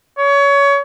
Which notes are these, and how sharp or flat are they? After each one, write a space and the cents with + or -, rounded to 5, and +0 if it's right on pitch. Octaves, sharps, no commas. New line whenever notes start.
C#5 +25